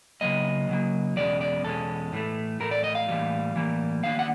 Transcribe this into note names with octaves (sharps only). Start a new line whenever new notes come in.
C#3 F#3 A#3 D#5
C#3 F#3 A#3
E2 B2 G#3 C#4 D5
D5
E2 B2 G#3 C#4 A4
A2 E3 A3
A2 E3 A3 A#4
D5
D#5
F5
A2 E3 G3 A#3
A2 E3 G3 A#3
D#3 G3 A#3 D4 F5
F#5